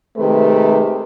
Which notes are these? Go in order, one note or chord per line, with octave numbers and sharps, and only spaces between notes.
C3 D#3 G#3 A3 G4 B4